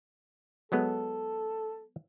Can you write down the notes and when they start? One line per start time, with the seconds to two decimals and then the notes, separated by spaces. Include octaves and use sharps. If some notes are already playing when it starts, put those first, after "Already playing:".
0.72 F#3 G#3 B3 A4